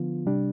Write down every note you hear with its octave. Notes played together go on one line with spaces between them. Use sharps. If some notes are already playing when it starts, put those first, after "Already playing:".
Already playing: D3 F3 B3 F4
C3 G3 D4